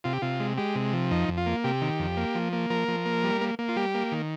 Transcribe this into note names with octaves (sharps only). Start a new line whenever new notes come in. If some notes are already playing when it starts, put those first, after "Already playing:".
C3 F4
G4
C3 F4
G#3
G#3 G4
C3
F3
F2 D#4
F2
F4
A#3
C3 G4
D#3
F2
A#3
F3
A#3
F3 A#4
F3
A#3
G3
A#3
A#3
F4
G3 G4
A#3
D#3